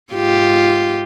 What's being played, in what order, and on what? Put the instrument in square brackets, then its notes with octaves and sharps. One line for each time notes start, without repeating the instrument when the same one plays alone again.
[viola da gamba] G#2 F4 G4